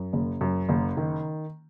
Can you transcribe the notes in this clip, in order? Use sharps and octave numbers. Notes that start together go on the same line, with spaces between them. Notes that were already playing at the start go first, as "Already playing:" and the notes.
Already playing: F#2
F#1
F#2
F#1
D#3